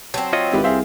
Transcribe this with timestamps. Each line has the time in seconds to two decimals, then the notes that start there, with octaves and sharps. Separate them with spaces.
0.14 F#3 C4 A5
0.33 F4 C#5 D#5
0.52 G#1 E4 G4 B4
0.64 C2 C4 G#4 E5 F5